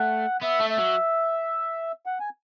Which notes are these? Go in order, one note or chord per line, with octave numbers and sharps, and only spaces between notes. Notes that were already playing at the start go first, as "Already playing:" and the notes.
Already playing: A3 F#5
B3 E5
A3
E5
F#3
F#5
G#5